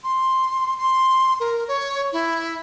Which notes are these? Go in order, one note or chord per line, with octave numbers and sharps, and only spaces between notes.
C6
C6
A#4
C#5
E4